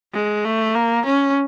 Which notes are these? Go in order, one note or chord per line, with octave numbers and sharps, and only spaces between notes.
G#3
A3
A#3
C#4